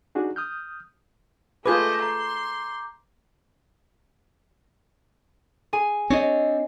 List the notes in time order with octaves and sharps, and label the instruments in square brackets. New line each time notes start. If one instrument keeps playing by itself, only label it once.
[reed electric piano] D4 D#4 F#4 G#4
D#6 F6 G6
[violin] A3 D#5 [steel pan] F4 G#4 B4 [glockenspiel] D6 G6
[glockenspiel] A#5 [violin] C6
[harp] G#4 G#5
[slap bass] C4 D4 [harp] C#5 D#5